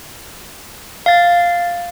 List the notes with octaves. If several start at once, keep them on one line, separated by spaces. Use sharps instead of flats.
F5 A6